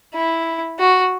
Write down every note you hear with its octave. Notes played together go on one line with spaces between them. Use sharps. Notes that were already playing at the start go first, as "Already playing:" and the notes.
E4
F#4